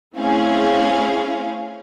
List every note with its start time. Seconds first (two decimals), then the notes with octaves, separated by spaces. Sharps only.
0.16 A3 C4 C#4 E4 G#4 F5